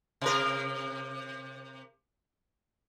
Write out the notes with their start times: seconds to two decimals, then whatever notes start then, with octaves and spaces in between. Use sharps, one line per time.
0.21 C3 A#4